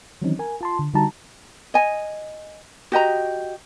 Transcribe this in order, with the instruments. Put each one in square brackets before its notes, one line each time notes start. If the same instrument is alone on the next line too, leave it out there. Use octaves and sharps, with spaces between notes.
[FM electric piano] D#3 E3 F#3 C4 C#4 D#4
A#4 G#5
F4 A5 C6
D3
D3 G3 D#4 F#4 A5 A#5
[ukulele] D#5 G#5
F#4 G4 D#5 A#5